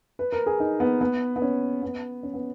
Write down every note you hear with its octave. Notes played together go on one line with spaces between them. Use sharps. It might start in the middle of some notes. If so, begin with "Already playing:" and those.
B4
A#4
G#4
D#4
B3
B3
B3
C#4
B3
C#4
B3